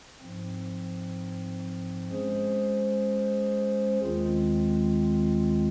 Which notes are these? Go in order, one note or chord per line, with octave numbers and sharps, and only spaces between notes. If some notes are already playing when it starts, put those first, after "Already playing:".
G#2 F3 C4
G#3 C#4 G#4 C5
D#2 D#3 G#3 C4 F4